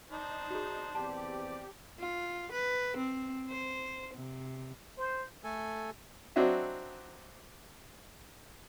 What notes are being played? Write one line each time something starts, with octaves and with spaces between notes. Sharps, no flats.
D4 D#4 C5
F#4 G#4
E2 C4 G4 D5 A5
F4
B4
C4
C5
C3
C5
A3 A4 G#5
F#3 C4 D4 F#4 D#5 E5